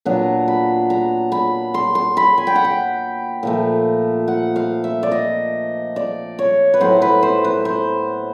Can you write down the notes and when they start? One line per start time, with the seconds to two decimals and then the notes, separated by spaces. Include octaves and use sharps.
0.05 A#2 F#3 B3 D4 A#5
0.48 B5
0.90 A#5
1.32 B5
1.74 C6
1.95 C6
2.17 B5
2.38 G#5
2.47 G5
2.55 F#5
2.64 G5
3.43 A#2 F3 A3
4.28 F#5
4.56 F5
4.84 E5
5.03 D5
5.11 D#5
5.96 D5
6.39 C#5
6.74 B4
6.80 A2 F#3 B3 C5
7.02 B4
7.23 C5
7.44 B4
7.65 C5